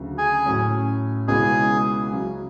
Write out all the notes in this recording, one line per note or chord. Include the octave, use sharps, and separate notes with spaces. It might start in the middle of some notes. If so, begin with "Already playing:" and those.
Already playing: D2 C#3 F#3
G#4 G#5
A2 F#3 C#4
C#2 B2 G#3 C#4 E4 G#4 G#5
C#3 F#3 C#4